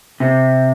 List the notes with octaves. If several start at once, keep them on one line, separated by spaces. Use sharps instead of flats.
C3